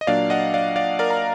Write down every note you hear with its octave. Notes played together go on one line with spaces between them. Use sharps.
D#5
A#2 F#3 A#3 D4 D5 F5
D#5 F#5
D5 F5
D5 F5
A#4 D5
A#5